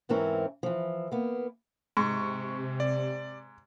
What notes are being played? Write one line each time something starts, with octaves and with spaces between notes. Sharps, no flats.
E2 G#2 E3 C4 C#4 A#4
E3 F3
A#3 B3
G#2 C3 C#6
D5